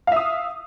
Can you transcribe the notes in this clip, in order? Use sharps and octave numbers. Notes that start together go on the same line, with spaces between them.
E5 F5 D#6